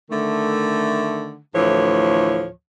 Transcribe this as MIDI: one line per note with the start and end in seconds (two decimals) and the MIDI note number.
0.10 1.38 50
0.10 1.38 51
0.10 1.38 57
1.55 2.48 38
1.55 2.48 45
1.55 2.48 52
1.55 2.48 53
1.55 2.48 73